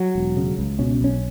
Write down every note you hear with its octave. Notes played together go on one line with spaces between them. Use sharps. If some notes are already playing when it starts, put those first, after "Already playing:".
Already playing: F#3
E1
C#3
C#2
B2 C#4
B1 C#4